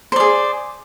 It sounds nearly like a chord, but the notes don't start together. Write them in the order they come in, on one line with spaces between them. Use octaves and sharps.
C5 D5 G#4